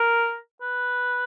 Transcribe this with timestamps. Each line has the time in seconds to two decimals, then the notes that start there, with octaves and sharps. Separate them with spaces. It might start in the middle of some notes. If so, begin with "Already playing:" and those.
Already playing: A#4
0.62 B4